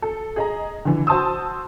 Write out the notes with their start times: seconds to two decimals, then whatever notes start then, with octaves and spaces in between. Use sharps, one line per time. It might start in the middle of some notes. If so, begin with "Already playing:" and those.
0.02 A4
0.36 G#4 D#5 A#5
0.85 D3 E3
1.07 F#4 C5 A5 C6 D#6 E6